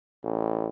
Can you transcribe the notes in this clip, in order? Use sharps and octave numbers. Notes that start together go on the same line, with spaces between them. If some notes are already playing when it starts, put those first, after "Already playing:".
A1